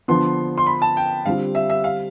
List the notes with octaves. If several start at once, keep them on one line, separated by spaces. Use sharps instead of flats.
D3 F3 B3 C6
C6
B5
A5
G5
D3 G3 C4 F4 F5
E5
E5
F5